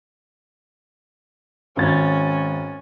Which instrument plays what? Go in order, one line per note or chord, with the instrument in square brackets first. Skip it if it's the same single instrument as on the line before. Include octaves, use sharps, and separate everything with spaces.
[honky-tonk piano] G#1 A6 [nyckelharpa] C#4